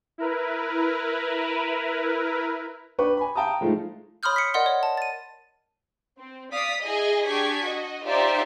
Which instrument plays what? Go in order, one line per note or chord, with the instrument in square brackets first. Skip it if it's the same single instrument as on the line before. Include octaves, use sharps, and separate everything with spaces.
[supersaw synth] E4 A#4 B4
[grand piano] D4 B4 G5 C#6 D6
G#5 B5
F5 G5 A5 A#5 D#6
F3 G#3 A3 D#4 F4
[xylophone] C#5 B5 C6 D#6 F6 G6
B6 C#7
A#4 D5 D#5 F#5 C6
C#5
A5
A6 D#7
[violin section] C4
D5 F5 D#6 B6
E4 G#4 D#5
D4 G4 G#4 C#6 G#6 B6
F#4 D#5
D#4 F4 G4 C5 D5 E5